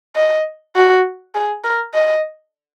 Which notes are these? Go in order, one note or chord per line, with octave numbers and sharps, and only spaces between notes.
D#5
F#4
G#4
A#4
D#5